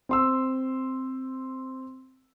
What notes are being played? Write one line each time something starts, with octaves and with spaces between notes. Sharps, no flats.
C4 C6 E6